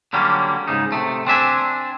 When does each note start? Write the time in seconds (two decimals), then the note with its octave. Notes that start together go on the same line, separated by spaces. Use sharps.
0.13 D3 F#3 G3 A#3 C#4
0.68 G#2 C#3 D#4
0.92 C3 A3
1.27 C4 D4 E5 G#5